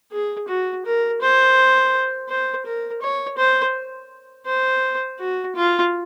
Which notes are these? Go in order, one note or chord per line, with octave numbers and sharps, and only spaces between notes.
G#4
F#4
A#4
C5
C5
A#4
C#5
C5
C5
F#4
F4